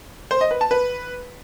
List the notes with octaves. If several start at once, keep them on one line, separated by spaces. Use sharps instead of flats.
C5
D#5
B4
A5
B4